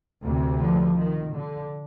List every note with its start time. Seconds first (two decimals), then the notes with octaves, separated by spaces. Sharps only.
0.22 D2 C3
0.59 D3 F3
0.96 D#3
1.34 D3